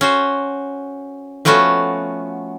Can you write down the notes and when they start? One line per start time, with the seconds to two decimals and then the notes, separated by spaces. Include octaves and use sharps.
0.01 C#4 F#4 C5
1.45 F3 A3 B3 C#4 F#4